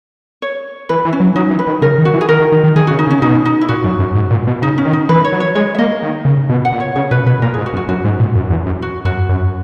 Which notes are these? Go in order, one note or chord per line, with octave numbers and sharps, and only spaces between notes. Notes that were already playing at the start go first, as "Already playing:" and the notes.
C#5
E3 B4
E3
C#4
F#3
F#3 D#4
E3
B4
D#3
C#3 A#4
D#3
F#4
E3
G#4
D#3 A#4
D#3
D#3
D#3
D#3 G#4
F#4
C#3
D#4
C#3
C#4
B2 D#4
D#4
E4
A#2 F#4
F#2
F#2
G#2
A#2
B2
C#3 D#4
C#4
D#3
D#4
E3 B4
C#5
F#3
C#5
G#3 C#5
E5
A#3 D#5
D#3
C#3
B2
F#5
A#2
C#5
C#3 C#5
B2 B4
B2 B4
A#2 A#4
G#4
G#2
F#4
F#2
F#4
F#2 F#4
G#2
A#2
F#2
E2
F#2
F#4
F#2 F#4
F#2